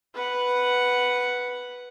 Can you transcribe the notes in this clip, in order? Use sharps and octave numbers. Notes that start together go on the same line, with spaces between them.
B4 F#5